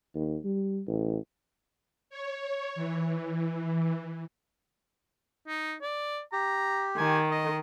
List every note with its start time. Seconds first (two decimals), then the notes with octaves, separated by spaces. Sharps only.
0.15 D#2
0.45 G3
0.87 A1
2.10 C#5
2.75 E3
5.48 D#4
5.82 D5
6.33 G4 A#5
6.97 D#3 G#5
7.31 D#5